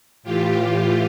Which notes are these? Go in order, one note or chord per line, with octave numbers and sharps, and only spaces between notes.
A2 E3 F4 G4